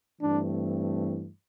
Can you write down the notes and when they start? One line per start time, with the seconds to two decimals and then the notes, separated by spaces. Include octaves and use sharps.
0.22 G2 E3 A3 C4 D4